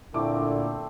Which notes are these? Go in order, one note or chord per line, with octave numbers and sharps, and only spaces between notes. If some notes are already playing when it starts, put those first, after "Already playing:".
A#2 D3 A3 C4 E4 D6